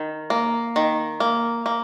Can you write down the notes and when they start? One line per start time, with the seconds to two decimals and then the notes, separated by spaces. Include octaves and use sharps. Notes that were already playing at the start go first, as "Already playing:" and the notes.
Already playing: D#3
0.30 A#3
0.76 D#3
1.20 A#3
1.66 A#3